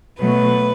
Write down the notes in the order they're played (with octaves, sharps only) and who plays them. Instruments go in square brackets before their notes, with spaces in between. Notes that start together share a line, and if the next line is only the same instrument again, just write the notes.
[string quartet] B2 F#3 A3 B4